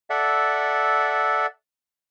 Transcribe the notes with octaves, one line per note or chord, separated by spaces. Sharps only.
A4 D5 E5 F#5